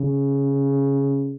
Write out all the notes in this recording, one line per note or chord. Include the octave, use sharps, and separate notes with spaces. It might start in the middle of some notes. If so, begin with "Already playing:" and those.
Already playing: C#3